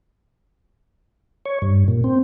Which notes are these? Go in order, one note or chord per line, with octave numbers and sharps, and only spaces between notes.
C#5
G2
A#2
C4